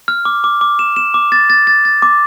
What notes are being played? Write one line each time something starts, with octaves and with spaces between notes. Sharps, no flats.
F6
D6
D6
D6
E7
E7
D6
A6
A6
A6
A6
D6